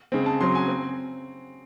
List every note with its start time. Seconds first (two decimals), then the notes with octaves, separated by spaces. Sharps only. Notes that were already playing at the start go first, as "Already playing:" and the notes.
0.12 C#3 G#3 C4
0.26 A5
0.40 C#3 F#3 C4 C6
0.55 G#5
0.68 C4